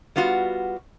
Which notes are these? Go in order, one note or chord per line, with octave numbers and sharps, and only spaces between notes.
G3 B3 F4 F#4